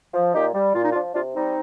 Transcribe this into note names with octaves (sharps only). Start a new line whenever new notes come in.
F3
A#2 D#4 G4
G3
A#2 F4
D#4
F3 D4 F4
C3 D4 F4
G3 C4 D#4